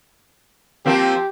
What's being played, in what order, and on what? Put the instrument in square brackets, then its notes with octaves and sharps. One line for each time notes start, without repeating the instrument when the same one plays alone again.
[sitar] F3 A#3 C4 [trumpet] G4